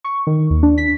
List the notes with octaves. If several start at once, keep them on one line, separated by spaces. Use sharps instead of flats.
C#6
D#3
D#2
D4
B6